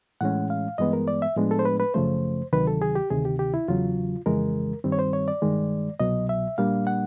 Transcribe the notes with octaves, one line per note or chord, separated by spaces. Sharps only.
A2 E3 G#3 C#4 F#5
F5
G2 E3 G#3 B3 D#5
A#4
D5
E5
A2 F3 G#3 B3 D4
A4
C5
B4
B4
F#2 C#3 F3 A3 C5
D2 C3 D#3 F#3 B4
A4
G#4
G4
D2 C3 D#3 G#4
G4
G4
E4
E2 C#3 F#3 F4
F2 C#3 E3 G#3 A#4
G2 D#3 G3 C4
C#5
C5
C#5
D5
G2 D#3 G#3
C2 B2 F#3 D#5
E5
A#2 G3 A#3 D4 F5
F#5